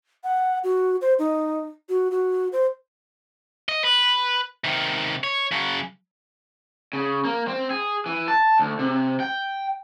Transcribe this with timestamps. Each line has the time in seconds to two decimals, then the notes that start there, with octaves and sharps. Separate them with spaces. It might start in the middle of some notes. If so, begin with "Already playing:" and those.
0.24 F#5
0.64 F#4
1.01 C5
1.19 D#4
1.89 F#4
2.11 F#4
2.52 C5
3.69 D#5
3.84 B4
4.64 C3 D#3
5.24 C#5
5.52 C#3 F#3
6.93 C#3
7.25 A#3
7.48 C4
7.71 G#4
8.06 E3
8.28 A5
8.59 D2
8.79 C3
9.20 G5